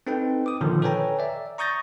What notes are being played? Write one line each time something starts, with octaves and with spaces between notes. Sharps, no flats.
C4 D#4 A4 B4 G5
D6 D#6
A#2 D3 D#3 F3
A4 B4 C#5 G5 G#5 A#5
D5 E5
A#5 C#6 D#6 G6 A6 A#6